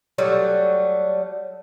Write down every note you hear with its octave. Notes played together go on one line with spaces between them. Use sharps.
F#3 G3 A3